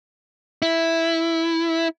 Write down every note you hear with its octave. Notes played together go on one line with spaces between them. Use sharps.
E4